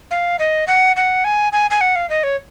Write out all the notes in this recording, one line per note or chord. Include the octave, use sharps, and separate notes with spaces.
F5
D#5
F#5
F#5
G#5
G#5
G#5
F#5
F5
D#5
C#5